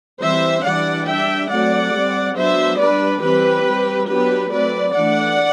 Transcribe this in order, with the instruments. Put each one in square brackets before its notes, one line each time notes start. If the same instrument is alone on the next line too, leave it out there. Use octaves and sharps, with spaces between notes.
[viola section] E3 G3 C4 C5 E5
E3 G3 D4 D5 F#5
G3 D4 E5 G5
F#3 A3 C4 D5 F#5
G3 C4
F#3 B3 D4 C5 E5
G3 D4 B4 D5
E3 G3 C4 G4 B4
G3 C4
F#3 B3 D4 G4 B4
F#3 A3 C4 B4 D5
E3 A3 D4 D5 F#5